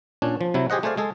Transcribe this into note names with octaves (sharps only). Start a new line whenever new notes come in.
A#2 C#4 D4
F3
C3 F#3 E4
G4 G#4 C5 D#5 F#5
A3 G#4 C5 D5 F5
G#3 G#4 A4